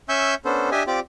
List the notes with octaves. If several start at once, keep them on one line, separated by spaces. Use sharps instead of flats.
C#4 E5 G#5 C#6 E6 G6
B3 C#4 D4 A4 C5
D4 G4 D#5 E5 G#5
C4 F4 G4 D5 D6